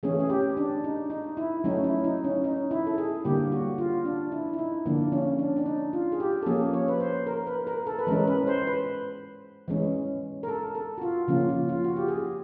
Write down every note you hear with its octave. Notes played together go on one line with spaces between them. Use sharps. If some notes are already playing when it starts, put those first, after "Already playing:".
E3 A3 C#4 G#4
G#4
G4
D4
D#4
D#4
E4
F#3 A3 C#4 D#4
E4
D#4
C#4
D#4
E4
A4
G#4
D3 G3 A#3 G4
F#4
F4
D4
E4
E4
D#4
D3 F3 A#3 D4
C#4
D4
D4
D#4
F4
G#4
G4
A4
F3 A#3 C#4 G#4
C#5
B4
C5
A#4
B4
A#4
A4
B4
E3 G#3 C#4 A#4
B4
C5
B4
E3 G#3 C#4
A#4
A4
A4
F#4
F4
C#3 F3 A#3 C#4 F4
F4
F4
F#4
G4
G#4